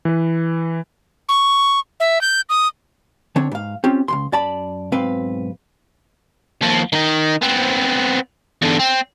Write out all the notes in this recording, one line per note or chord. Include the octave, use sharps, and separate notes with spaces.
E3 B4
C#6
E5
G6
D#6
D3 C4 D4 C#5
G#2 F5
C4 C#4 F4 G4
C#2 G#2 C6
F#2 D5 A5 B5
B1 G#2 C4 B4 F5
D#2 F3
D#3 D#4
B3 C4
E2 D3
C4